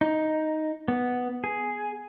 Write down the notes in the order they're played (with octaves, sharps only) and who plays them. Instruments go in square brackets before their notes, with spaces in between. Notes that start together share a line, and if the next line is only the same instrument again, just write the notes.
[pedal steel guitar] D#4
B3
G#4